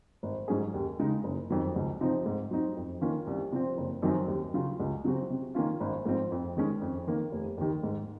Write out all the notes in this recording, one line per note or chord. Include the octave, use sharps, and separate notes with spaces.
G#1
G#2 F#3 C#4 G#4
D#2
C#3 G#3 D#4
F#1
F2 D#3 F#3
C#2
C3 F3 C4 D#4
G#2
F#3 C4 D#4
F2
D#3 A#3 C#4 F4
C2
C3 F3 C4
F#1
F#2 D#3 F#3 C4
D#2
C#3 F#3 C#4 F4
C#2
C#3 F#3 C4 F#4
C3
D#3 A#3 C#4 F4
G#1
G#2 F3 C4
F2
D#3 G#3 C#4
F2
D#3 A#3
F1
D#2 D#3
G#2